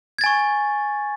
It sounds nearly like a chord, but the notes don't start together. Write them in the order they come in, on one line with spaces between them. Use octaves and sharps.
G#6 A6 G#5 C#6